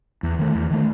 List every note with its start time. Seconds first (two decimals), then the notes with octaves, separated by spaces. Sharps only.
0.23 E2
0.39 D#3 A3
0.55 E2
0.70 D#3 A3